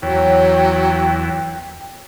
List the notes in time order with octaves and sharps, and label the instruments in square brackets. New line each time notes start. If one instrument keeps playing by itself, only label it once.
[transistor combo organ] E2 [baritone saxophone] F#3 [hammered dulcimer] C#5 [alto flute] G5